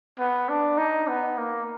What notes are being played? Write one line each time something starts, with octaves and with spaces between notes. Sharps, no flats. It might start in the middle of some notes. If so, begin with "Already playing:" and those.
B3
D4
D#4
B3
A#3